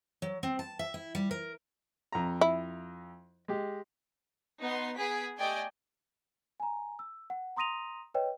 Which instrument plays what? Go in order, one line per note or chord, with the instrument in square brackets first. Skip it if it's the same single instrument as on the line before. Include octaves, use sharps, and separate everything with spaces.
[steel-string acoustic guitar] F#3
C4
A5
E5
E4
G3
A#4
[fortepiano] F2 A#5
[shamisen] E4
[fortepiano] G#3 G4
[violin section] B3 D#4 C6
B3 G#4 B6 D7
A3 G4 D5 D#5 G5 G#5
[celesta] G#5 A#5
E6
F#5
A#5 C6 D#6 A#6 D#7 F7
B4 C#5 D#5 G5